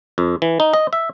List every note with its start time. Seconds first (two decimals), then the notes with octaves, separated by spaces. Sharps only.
0.18 F2
0.42 E3
0.60 D#4
0.74 D#5
0.93 E5